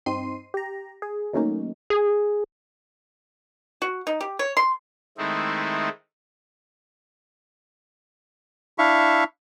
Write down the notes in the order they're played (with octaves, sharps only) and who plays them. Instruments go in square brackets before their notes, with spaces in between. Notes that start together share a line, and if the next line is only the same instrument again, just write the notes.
[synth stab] G2 C4 D#4 C6 C7 D#7
G4 A#5
G#4
D#3 F#3 A3 A#3 C#4 D#4
[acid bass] G#4
[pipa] F#4
D#4
G4
C#5
C6
[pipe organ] D#3 G#3 A3 C4 D#4 E4
[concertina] D4 E4 E5 F5 C#6